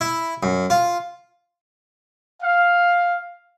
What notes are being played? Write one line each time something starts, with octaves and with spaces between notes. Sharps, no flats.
E4
F#2
F4
F5